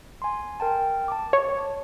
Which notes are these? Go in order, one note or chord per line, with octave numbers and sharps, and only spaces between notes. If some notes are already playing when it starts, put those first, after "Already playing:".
G#5 C6
A#4 G5 A5
A5 D6
C#5